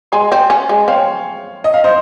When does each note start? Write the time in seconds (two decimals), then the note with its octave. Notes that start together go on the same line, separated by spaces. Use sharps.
0.12 G#3 G#5 C6
0.32 C4
0.50 C#4
0.69 G#3
0.88 C4 C#5 F5
1.64 D#5
1.74 F5
1.84 C5 D#5